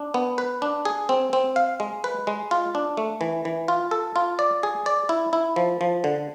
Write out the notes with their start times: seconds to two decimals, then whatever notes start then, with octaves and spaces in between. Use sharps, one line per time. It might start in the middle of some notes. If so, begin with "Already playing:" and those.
Already playing: D4
0.14 B3
0.38 B4
0.62 D4
0.85 G#4
1.09 C4
1.33 C4
1.56 F5
1.80 G#3
2.04 B4
2.27 G#3
2.51 F4
2.75 D4
2.97 A3
3.21 E3
3.45 E3
3.68 F4
3.91 A4
4.16 F4
4.39 D5
4.63 G#4
4.86 D5
5.09 E4
5.33 E4
5.56 F3
5.81 F3
6.04 D3